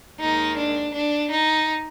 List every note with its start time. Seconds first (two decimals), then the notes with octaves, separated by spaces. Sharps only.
0.20 D#2 D#3 G#3 D#4
0.58 D4
0.95 D4
1.32 D#4